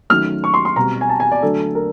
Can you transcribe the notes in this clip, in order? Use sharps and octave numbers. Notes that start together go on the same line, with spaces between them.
D#3 F#3 A3 C#4 F6
C#6
C6
C6
B2 G3 C4 A#5
G#5
A5
G#5
D5
D3 F#3 A3 D4 A4
A#4